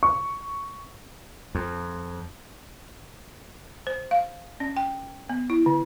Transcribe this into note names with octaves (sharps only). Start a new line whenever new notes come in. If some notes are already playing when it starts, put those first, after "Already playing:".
C#6
F2
C5
F5
C#4
G5
B3
E4
D3